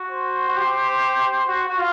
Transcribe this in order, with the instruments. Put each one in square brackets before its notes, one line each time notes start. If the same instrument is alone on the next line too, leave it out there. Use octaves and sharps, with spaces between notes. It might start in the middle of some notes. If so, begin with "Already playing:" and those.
Already playing: [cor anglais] F#4
[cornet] C5
[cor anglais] F#4
G4
F#4
F#4
F4